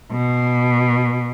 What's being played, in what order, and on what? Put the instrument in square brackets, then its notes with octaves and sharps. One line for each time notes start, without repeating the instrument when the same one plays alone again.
[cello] B2